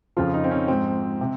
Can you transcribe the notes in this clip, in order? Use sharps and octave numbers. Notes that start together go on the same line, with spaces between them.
F2 C#3 F3 F4
D#4
C4
C#4
G#2 F3 C4
C3